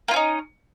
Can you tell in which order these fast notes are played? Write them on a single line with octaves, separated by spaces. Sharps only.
A#3 F4 C#4 D#4